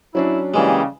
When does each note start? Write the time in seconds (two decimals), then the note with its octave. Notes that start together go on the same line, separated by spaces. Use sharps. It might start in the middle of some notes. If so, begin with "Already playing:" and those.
0.15 F#3 C#4 D4 E4
0.54 C#3 E3 G3 G#3 A#3